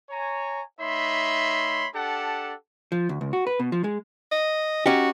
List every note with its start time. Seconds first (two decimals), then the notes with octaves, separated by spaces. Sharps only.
0.10 C#5 G#5 A#5
0.80 A3 D#4 C#5 E5 B5 C6
1.95 D4 G4 A4 F#5 A5
2.92 F3
3.09 D2
3.21 C#2
3.33 F#4
3.47 B4
3.60 B2
3.72 F3
3.84 G#3
4.32 D#5
4.86 C#4 D#4 F#4 G4